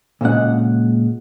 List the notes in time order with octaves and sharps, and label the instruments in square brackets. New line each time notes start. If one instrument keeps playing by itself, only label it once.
[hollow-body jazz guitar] A#2 C#3 G#3 F#5